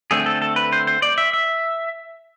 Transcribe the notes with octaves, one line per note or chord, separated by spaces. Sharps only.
D3 A3 C4 G#4
A4
A4
B4
C5
C5
D5
E5
E5